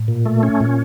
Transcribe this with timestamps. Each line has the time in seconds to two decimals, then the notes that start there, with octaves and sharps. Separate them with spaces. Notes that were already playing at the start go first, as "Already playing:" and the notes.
Already playing: A2
0.08 A#2
0.26 A3
0.43 C#4
0.60 A#2